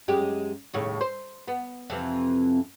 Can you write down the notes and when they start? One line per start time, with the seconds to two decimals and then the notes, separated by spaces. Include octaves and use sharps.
0.08 F#2 G#3 G4
0.74 D#2 A2 C#3
1.01 C5
1.48 B3
1.90 F2 C3 E3